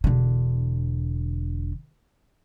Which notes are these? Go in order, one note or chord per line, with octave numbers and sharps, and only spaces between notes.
E1 D3